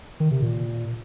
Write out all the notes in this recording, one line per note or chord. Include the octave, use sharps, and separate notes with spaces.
D#3
C3
A#2